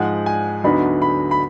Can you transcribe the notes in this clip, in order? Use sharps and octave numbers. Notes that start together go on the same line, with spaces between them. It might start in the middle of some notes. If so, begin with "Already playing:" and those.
Already playing: G#2 F3 G#3 F#5
G#5
D2 D3 F#3 B3 D#4 B5
B5
B5